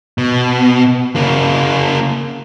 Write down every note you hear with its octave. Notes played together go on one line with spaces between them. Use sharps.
B2
C#3 A#3